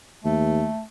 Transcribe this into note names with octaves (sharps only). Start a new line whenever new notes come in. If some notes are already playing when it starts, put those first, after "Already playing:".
D#2 A3